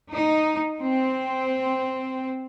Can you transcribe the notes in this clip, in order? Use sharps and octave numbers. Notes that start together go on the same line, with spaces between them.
D#4
C4